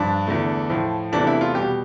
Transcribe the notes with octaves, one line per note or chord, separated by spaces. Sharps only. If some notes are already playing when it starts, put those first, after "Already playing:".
Already playing: G2 F3 D4
E2 D3 A3
A2 F3 A3
E2 C3 E3 A3 D4
E4
F4
B2 G3 G4